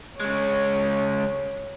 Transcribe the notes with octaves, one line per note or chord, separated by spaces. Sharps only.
C#3 G#3 C#5